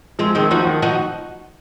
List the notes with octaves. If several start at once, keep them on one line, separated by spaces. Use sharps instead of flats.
F3 G#3 C4
D#3 G#3 C4
F3 D#4 F#4
D#3
F3 D#4 F#4